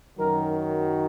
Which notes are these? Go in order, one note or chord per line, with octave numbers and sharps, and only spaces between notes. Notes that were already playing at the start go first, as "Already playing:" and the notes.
F#2 D#3 F#3 A#4